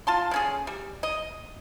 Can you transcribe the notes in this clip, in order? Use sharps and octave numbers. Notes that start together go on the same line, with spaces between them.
F4 A5 C6
D3 C#4 G#4
G3
D#5